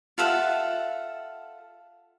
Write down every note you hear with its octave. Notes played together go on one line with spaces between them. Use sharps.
F4 A4 E5 F#5